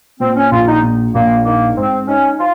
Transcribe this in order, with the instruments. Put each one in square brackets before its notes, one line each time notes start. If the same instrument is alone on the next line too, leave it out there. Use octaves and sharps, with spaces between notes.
[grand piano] A#2 [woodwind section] C4
[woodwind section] C#4
[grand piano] A#1 [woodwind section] F4
[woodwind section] D#4
[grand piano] A#2
[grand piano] A#1 [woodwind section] A#3
[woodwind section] A#3 [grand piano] D#4
[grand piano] G#2 [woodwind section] C4
[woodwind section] C#4 [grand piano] D#4
[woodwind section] F4